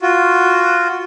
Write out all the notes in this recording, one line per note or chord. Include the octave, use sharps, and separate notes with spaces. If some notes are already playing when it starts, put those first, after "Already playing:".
F4 F#4